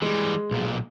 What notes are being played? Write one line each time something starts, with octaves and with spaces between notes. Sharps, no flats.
E3 G3 G#3
B1 A#2